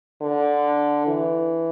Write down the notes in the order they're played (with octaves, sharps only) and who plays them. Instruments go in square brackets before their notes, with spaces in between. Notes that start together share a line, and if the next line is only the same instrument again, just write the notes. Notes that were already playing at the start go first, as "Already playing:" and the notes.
[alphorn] D3
E3